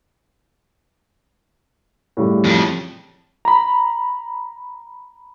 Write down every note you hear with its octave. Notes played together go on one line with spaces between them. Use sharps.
A2 C#3 G3
F2
A#5 B5